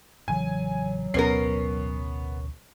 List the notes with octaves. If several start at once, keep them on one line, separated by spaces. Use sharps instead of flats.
A1 C#3 E3 F#3 G#5
A1 D2 B2 B3 C#4 A#4 C7